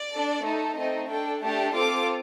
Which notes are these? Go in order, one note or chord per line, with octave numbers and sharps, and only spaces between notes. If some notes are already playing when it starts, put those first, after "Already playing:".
Already playing: D5
D4 A4
A3 D#4 A4
A3 C4 D#4 D#5
D4 A4 G5
A3 D4 G4 A5
C4 F4 A4 D6